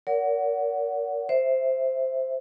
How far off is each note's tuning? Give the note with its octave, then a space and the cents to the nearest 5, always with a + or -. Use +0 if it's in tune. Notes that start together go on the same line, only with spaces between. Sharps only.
A#4 +0 D5 -45 F#5 +0
C5 +0 E5 +0